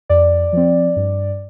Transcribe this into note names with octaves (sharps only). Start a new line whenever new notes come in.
F2 D5
F3 C4
G2